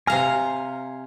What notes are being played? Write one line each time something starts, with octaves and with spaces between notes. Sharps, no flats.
C3 F5 G#5 A#5 F6